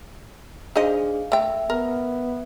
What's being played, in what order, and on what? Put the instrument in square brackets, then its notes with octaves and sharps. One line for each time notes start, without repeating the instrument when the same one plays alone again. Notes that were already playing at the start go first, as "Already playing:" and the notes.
[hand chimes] D4 G#4 F5 [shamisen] D#4 C5 D#5
[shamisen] A3 G5 [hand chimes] E5
[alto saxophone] B3 [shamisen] A#4